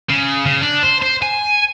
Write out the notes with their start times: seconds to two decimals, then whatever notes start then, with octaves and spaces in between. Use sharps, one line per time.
0.09 C#3
0.46 C#3
0.61 D4
0.83 C5
1.02 C5
1.23 G#5